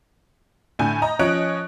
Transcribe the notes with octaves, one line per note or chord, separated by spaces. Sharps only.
A2 D3 G#5 G6
D#5 A#5
F3 C#4 C#5 D#5 F#6 D7